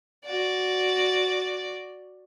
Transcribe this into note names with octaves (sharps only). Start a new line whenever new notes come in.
F#4 D5